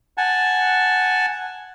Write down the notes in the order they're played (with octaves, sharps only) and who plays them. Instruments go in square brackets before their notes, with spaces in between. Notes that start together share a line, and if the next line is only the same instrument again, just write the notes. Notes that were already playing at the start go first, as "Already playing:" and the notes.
[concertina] F#5 G#5 A5